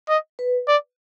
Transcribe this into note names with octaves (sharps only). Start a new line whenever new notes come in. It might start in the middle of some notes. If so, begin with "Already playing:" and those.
D#5
B4
D5